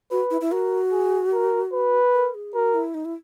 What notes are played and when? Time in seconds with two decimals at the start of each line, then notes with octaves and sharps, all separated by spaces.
0.11 F#4 B4
0.31 E4
0.41 E4
0.51 F#4 A#4
0.92 G#4
1.33 A#4
1.73 B4
2.14 A#4
2.34 G#4
2.54 F#4 A#4
2.74 E4
2.94 D#4
3.05 E4